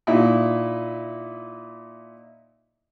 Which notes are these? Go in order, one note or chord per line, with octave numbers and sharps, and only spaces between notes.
A#2 D#4 E4